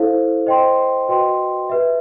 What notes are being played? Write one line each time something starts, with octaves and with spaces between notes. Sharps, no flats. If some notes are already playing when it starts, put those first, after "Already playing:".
Already playing: E4 A4 C5 F5
C5 D#5 G5 C6
F#4 B4 D#5 G5 C6
G4 B4 E5